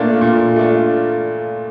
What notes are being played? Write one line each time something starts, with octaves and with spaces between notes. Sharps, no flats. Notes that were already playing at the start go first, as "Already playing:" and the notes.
Already playing: A#2 A3 A#3 D4 F4
A#2
A3 D4 F4